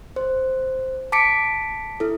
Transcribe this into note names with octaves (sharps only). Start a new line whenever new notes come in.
C5
A5 D6 B6 C#7 D7
E4 A4